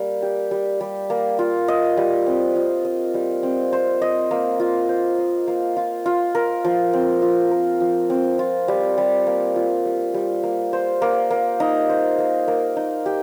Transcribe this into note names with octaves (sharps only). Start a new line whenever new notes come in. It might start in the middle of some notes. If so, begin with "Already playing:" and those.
Already playing: G3 A#3
G4
G3
G3
A#3
F4
D#5
G3
C4
F4
D#5
G3
C4
C5
D#5
A#3
F4
C5
D#5
A#3
F4
F4
A#4
F3
C4
F4
A#4
F3
C4
F4
G3
G3
A#3
F4
G3
G3
A#3
C5
A#3
A#3
D#4
C5
A#3
A#3
D#4
G4